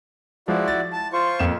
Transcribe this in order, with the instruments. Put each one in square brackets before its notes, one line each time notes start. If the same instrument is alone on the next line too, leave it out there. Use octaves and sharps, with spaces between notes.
[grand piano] F3 G#3 [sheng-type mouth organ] E4 F#4 D5
[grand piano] A6
[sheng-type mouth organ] A5
F4 C5 C#6
[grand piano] F2 A#3 E7